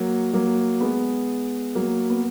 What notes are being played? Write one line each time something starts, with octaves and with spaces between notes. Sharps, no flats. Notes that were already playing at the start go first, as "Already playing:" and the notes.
Already playing: F#3 A#3
F#3 A#3
G#3 B3
F#3 A#3
B3